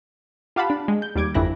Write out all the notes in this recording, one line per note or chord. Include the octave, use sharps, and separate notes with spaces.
F4 G4 F5 F#5 A5 B5
D4
G#3
G6
D#2 G3 D6 G#6 D7
G1 F2 D4 E4 F#6 A#6